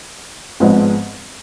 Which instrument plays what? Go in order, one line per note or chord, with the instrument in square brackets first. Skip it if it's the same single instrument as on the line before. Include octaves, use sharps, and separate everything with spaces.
[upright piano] G#1 G#2 F3 G#3 B3